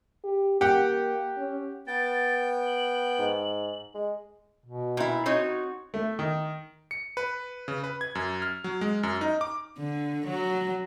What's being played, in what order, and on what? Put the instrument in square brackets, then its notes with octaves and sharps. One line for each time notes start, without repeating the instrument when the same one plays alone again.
[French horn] G4
[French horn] A#3 [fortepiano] G4 F#5
[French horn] C#4
[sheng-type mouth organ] B3 G5 [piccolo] A6
[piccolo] F#7
[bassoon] G#2
G#3
[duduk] B2
[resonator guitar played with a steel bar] A#2 E4
[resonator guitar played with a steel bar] C4 D#4 C#5 [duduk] F#4
[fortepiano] A3
D#3
[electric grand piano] C#7
B4
C#3
B4
G#6
F#2
F6
F#3
G#3
F#2
D#4
D6
[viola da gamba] D3
F#3